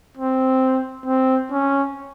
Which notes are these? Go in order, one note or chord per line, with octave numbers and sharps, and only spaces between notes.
C4
C4
C#4